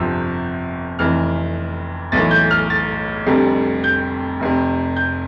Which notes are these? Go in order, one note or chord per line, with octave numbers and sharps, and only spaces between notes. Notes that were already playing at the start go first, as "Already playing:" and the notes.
Already playing: G1 F2 C3 F3 E6
F1 F2 E3 F6
B1 A2 E3 A6
G6
F6
A6
F1 F2 D3 G3
G6
F1 F2 C3
G6